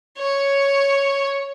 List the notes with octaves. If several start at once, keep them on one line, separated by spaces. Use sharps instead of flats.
C#5